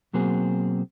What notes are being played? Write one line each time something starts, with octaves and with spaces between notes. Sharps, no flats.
B2 F#3 A#3 C4 G#4